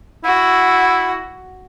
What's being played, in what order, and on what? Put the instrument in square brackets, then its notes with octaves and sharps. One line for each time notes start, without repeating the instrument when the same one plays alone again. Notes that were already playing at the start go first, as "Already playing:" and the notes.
[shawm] E4 [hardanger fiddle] F#4